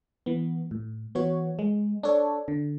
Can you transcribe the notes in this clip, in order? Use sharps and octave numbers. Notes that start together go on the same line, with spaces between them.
E3 B3
A2
E3 B3 F#4 C#5
G#3
D4 A4 C#5
D3